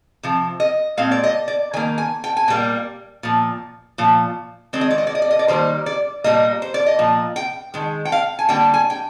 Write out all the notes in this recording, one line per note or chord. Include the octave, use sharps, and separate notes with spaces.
C3 F3
D#5
A#2 G#3 C4 F5
D5
D#5
D5
D#3 A#3 G#5
G#5
G5
G#5
A#2 G3 A#3 G5
A#2 F3
A#2 F3
D#3 G#3 C4 D5
D#5
D5
D#5
D5
D#5
D5
D#5
D5
D#3 G3 A#3 C5
D5
A#2 G3 A#3 D#5
C5
D5
D#5
A#2 F3
G5
D#3 G#3
G5
F5
G#5
D3 G3 A#3 G5
G#5
G5